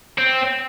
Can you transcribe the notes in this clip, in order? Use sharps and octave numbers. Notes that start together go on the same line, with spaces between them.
C4